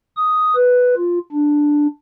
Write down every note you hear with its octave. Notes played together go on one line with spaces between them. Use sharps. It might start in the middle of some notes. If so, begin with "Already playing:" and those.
D#6
B4
F4
D4